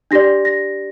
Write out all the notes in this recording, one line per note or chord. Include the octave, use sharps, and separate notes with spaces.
D4 G4 D5 A#6
A#6